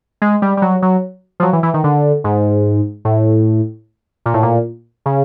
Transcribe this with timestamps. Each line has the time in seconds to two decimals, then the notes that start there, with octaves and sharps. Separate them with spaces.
0.22 G#3
0.42 G3
0.57 G3
0.62 F#3
0.82 F#3
1.40 F3
1.43 F#3
1.53 E3
1.63 E3
1.74 D#3
1.84 D3
2.24 G#2
3.05 A2
4.26 A#2
4.34 A2
4.43 A#2
5.06 C#3